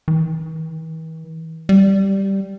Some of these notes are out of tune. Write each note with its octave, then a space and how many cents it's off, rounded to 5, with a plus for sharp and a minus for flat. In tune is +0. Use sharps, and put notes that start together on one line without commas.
E3 -45
G3 -5